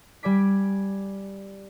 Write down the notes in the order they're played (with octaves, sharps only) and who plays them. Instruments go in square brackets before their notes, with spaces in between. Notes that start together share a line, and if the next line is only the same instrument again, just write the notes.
[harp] G3 D5 G#5 D6 B6